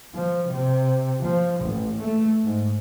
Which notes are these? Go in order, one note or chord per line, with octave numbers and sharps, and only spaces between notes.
F3
C3
F3
A1
A3
G#2